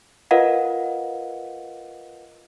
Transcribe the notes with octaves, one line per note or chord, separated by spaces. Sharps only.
F4 A#4 B4 D#5 F5 F#5